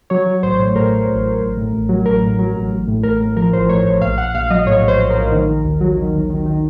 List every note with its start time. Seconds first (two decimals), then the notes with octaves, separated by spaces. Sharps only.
0.10 F#3 C#5
0.27 F#3
0.43 A1 C5
0.59 A2
0.76 A2 A#4
0.92 A2
1.08 A1
1.24 A1
1.41 A1
1.57 A2
1.73 A1
1.89 F#3
2.06 A1 A#4
2.22 A2
2.39 F#3
2.55 A1
2.71 A1
2.88 A2
3.03 A1 A#4
3.21 A2
3.36 F3 A#4
3.53 A1 C5
3.69 A2 C#5
3.85 A1
4.02 A#1 F5
4.18 A#1 F#5
4.34 A#1 F5
4.50 F#3 D#5
4.66 A2 C#5
4.83 A#1 C5
4.99 A#1
5.10 A#4
5.16 A#1
5.32 D#3
5.48 D#3
5.64 D#2
5.81 F#3
5.97 D#3
6.14 D#2
6.30 D#3
6.46 D#3